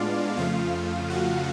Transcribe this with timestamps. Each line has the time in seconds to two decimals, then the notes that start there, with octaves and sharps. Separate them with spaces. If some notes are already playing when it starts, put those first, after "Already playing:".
Already playing: A2 G#3 B3 D4 F4 D5 F5
0.37 F2 C#3 F3 A3 F4 F5
1.10 F#4 F#5